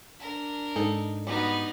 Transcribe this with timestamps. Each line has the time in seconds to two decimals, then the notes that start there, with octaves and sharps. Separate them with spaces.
0.21 D4 A#4
0.76 G#2 D#4 A4
1.27 G3 B3 D#4 F#4